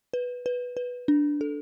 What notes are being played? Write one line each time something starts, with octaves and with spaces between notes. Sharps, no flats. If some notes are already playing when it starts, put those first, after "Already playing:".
B4
B4
B4
D4
A4